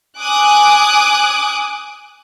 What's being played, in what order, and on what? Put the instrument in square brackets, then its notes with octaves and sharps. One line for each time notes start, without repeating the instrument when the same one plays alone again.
[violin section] G#5 D6 D#6 F#6